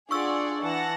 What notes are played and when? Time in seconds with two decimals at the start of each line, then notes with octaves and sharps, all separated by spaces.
0.11 D4 F4 G#4 D5 F#5 C#6 E6
0.62 E3 F#5 A5 A#6